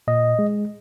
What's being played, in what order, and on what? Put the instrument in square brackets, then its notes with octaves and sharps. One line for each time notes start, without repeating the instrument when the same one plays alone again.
[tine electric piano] A#2 D#5
G#3